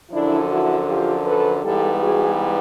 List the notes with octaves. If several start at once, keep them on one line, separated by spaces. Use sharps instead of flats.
F#2 D3 F3 D4 E4
E4 F#4
F4 G4
A4 B4
G#2 E3 G3 B3 G4 A4
F#4 G#4